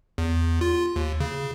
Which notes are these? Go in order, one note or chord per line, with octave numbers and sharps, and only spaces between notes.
E2
F4
D#2
C#3